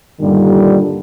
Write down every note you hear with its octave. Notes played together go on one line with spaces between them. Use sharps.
G2 A#2 D3 D#3 G3